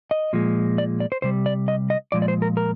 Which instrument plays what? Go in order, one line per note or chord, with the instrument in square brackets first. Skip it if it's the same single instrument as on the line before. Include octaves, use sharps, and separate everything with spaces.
[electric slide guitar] D#5
A#2 F3 G#3
D5
D5
C5
C3 G3 C5
D5
D#5
D#5
A#2 F3 G#3 D5
D5
C5
A#4
A#4